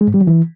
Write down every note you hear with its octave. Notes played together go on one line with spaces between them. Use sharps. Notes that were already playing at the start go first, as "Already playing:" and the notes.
G#3
G#2
G3
F#3
E3